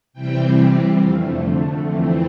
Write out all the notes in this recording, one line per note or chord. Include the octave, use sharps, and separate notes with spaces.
C3 E3 G3 C4 G5
F2 D3 A3 F5
C5
A4
F2 E3 A3 C4